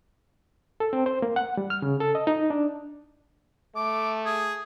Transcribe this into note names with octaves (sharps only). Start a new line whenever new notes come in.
A4
C4
C5
A#3
F#5
G3
F6
C#3
A4
D#5
D#4
D4
A3 D6
G#4